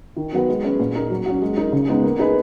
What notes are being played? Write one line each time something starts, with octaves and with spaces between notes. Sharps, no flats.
D#3
F#3 B3 F#4 B4
G#3
C#4 G#4 B4
A#2
A#3 D#4 A#4
F#3
C#4 F#4
G#3
D#4 A#4
C#3
G#3 B3 D#4
A#3
D#4 G#4 B4